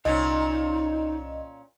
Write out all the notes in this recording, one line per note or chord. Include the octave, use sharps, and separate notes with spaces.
C2 A#2 C#4 D#4 D#5